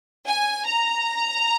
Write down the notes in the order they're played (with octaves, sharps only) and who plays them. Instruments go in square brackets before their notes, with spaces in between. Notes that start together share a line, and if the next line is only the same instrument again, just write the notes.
[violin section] G#5
A#5